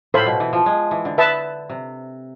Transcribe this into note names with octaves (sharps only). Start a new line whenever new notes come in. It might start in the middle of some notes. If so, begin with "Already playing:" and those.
A2 A4 C5 F5 B5
B2
E3
F3
G#3
E3
D3
B4 E5 A5
C3